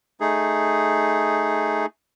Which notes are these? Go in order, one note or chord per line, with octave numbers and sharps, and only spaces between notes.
A3 D#4 G#4